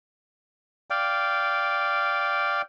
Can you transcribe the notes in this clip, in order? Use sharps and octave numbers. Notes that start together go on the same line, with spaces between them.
D5 F5 G5